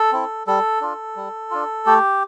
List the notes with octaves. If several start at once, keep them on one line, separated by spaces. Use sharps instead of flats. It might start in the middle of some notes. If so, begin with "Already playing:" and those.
Already playing: A4
C4 E4
G3 A4
D4 F4
G3
D4 F4
A3 G4